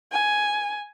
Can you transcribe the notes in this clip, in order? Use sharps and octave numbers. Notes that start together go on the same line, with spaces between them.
G#5